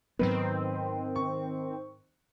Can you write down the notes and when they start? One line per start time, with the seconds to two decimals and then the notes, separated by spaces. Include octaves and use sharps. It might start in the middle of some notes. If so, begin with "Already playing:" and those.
0.19 G#2 D#3 F#3 B3 C4 B4
1.16 C#6